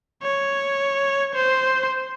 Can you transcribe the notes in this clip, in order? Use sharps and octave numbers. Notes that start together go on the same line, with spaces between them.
C#5
C5